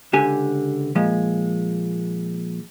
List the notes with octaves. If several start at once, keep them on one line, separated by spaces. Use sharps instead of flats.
C#2 D3 G4 G#5
A#2 F3 G#3